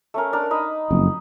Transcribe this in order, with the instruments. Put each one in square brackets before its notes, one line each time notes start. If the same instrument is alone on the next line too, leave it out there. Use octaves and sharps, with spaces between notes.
[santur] A3 C#4 A#4
D4 A#4
D#4 D#5 B5
[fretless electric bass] F#1 F2